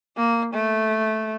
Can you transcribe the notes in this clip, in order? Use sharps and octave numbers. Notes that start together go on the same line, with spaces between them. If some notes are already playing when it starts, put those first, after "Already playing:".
A#3
A3